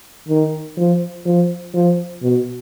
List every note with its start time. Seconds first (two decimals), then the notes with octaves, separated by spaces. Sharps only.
0.29 D#3
0.77 F3
1.25 F3
1.74 F3
2.22 B2